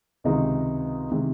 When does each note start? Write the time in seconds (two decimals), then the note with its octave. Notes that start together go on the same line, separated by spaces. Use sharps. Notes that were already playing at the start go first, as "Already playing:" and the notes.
0.24 C#2 C3 D#3 G#3 D#4
1.12 C3 D#3 G#3